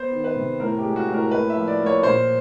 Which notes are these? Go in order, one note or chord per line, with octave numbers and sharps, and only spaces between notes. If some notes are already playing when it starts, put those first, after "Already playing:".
Already playing: B3 C5
D#3
B4
C3
A2 A#4
G4
G#3
F#4
A2
A#4
A#3 B4
E5
F3
D5
A#3
C#5
A#2 C5